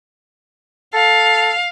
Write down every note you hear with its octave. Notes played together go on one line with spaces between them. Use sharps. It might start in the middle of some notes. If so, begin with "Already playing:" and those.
A4 F5